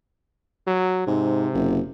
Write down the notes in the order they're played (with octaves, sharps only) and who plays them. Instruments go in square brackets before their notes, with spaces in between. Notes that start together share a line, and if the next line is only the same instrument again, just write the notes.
[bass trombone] F#3
[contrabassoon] G#2 [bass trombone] C3
[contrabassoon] F#1